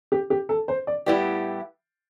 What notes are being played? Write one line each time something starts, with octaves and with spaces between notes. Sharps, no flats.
G4
G4
A4
C5
D5
A2 G3 B3 E4 G4 D5